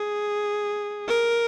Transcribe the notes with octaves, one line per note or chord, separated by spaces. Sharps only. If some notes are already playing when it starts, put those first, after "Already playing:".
Already playing: G#4
A#4